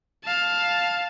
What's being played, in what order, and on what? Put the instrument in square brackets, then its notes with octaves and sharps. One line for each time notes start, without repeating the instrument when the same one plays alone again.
[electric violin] F5 A5